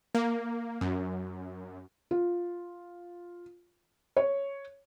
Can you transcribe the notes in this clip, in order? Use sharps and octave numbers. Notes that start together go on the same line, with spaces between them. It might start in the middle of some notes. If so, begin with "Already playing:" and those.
A#3
F#2
F4
C#5